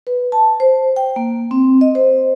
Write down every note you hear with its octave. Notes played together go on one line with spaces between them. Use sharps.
B4
A5
C5
G5
A#3
C4
D#5
C5